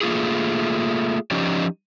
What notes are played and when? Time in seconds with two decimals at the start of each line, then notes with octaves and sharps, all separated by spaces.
0.01 A3 A#3 F4 G#4
1.31 F3 C#4 D#4 G4 D5